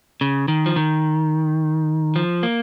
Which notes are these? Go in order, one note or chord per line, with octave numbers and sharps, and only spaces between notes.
C#3
D#3
F3
D#3
F3
A#3